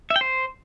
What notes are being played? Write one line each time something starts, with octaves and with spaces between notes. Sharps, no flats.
E5
G5
C5